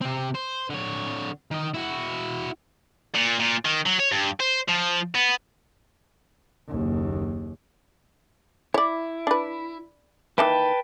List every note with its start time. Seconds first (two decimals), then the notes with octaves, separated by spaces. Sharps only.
0.01 C3 C4
0.34 C5
0.70 D3 C#5
1.51 D#3 D#5
1.75 E4 F#4
3.15 A#2
3.39 A#2
3.65 D#3
3.86 F#3
4.00 C#5
4.12 G2
4.40 C5
4.68 F3
5.15 B3
6.68 F#1 D#2
8.74 E4 C#5 D5
9.27 D4 B4
10.38 D#3 E3 A#3 B4 G5 A5